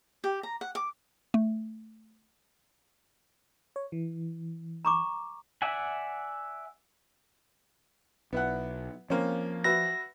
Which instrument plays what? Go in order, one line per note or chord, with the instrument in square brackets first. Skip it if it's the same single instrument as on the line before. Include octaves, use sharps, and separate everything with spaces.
[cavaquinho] G4
A#5
F#5
D6
[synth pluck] A3
[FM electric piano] C#5
E3
[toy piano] A#5 C#6 D6
[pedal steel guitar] D5 E5 F#5 G#5
[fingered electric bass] B1 [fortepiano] B3 E4 F#5
[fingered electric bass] F3 [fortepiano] A#3 C4 C#4
[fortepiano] F#4 B4 E5 [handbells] A#6